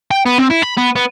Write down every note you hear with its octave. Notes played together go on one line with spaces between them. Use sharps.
G5
B3
C4
E4
B5
B3
B3